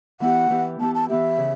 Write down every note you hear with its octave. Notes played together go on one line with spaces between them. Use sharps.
E3 B3 E4 G4 F#5
E3 B3 E4 G4
E3 B3 E4 G4 A5
A5
E3 B3 E4 G4 E5
C#3